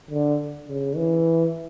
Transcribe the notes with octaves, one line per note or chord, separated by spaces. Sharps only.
D3
C#3
E3